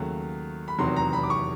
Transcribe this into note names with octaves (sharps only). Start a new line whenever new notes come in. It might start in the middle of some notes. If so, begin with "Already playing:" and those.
Already playing: D#2 C#3 F#3 A3
B5
F1 E2 C3 D#3 F#3 C6
A#5
B5
D6
C#6